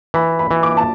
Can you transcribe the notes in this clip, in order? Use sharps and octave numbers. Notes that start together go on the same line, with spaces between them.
E3 B5
B5
E3
D6
A5